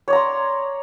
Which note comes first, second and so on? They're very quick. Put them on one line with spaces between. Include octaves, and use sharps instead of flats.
C#5 D5 A#5 C6